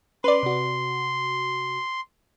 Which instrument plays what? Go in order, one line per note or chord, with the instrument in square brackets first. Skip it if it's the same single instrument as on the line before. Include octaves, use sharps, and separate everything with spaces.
[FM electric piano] C#4 [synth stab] B4 D5 [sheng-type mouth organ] C6
[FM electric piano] C3 F#4